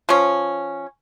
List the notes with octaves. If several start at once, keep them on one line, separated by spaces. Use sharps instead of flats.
F3 C#4